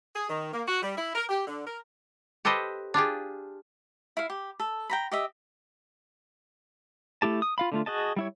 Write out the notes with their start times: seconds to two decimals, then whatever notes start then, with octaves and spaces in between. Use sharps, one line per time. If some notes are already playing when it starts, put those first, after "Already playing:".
0.16 G#4
0.30 D#3
0.53 A#3
0.67 F#4
0.83 G3
0.97 E4
1.15 A#4
1.29 G4
1.48 D3
1.66 A#4
2.45 G4 A4 B4 C5 D#5
2.94 D4 F4 G4 G#4
4.17 E4 F5
4.30 G4
4.60 A4
4.89 G5 A#5 B5
5.11 G4 D#5 E5
7.22 A3 E4 G4 A5
7.42 D#6
7.58 F4 F5 B5
7.72 D3 A3 F4
7.86 F#4 G#4 D#5 A5
8.16 G3 E4 C#5